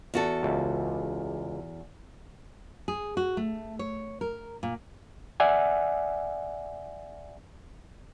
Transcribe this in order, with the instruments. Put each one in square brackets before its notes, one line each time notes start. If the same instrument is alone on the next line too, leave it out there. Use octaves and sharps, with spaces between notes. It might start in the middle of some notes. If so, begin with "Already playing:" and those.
[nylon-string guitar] E2 F#4 A4
[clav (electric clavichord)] C#2
[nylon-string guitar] G#4
F#4
A3
C#5
A#4
A#2
[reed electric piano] D5 E5 F#5 G#5